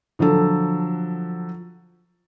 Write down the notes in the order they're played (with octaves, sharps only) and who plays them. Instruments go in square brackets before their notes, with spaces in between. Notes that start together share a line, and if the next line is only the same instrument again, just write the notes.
[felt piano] D3 F3 F#3 A4